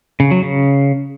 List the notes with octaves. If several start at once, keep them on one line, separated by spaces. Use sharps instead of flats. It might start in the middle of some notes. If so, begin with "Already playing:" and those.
C#3
F#3
C#3